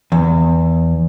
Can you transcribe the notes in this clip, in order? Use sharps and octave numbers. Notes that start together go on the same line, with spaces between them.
E2